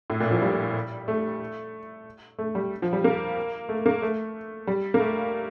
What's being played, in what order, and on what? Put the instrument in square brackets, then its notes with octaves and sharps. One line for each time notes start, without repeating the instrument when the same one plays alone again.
[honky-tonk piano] A2
A#2
F3
G3
A3
A3
G3
F3
G3
A#3
A3
A#3
A3
G3
A#3
A3